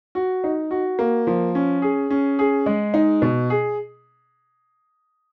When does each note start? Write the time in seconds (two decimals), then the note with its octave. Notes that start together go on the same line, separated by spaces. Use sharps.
0.15 F#4
0.44 D#4
0.71 F#4
0.99 A#3
1.27 F3
1.55 C#4
1.82 G#4
2.10 C#4
2.39 G#4
2.66 G#3
2.94 D#4
3.22 B2
3.50 G#4